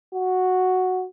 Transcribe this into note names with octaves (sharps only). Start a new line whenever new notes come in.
F#4